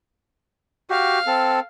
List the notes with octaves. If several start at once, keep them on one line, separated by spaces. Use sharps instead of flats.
F#4 G4 F5
C4 A4